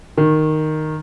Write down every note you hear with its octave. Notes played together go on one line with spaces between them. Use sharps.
D#3